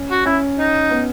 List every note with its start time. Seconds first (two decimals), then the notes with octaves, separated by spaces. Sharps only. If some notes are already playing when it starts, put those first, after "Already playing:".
Already playing: C#4
0.11 F#4
0.26 C#4 E4
0.59 D#4
0.91 B3